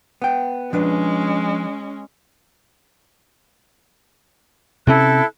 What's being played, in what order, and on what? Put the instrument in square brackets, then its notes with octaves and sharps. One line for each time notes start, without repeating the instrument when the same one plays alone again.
[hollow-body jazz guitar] B3 G5
[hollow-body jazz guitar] F3 D4 B4 [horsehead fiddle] G#3 C#4
[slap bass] C3 C4 C#4 [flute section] E4 A4 F#6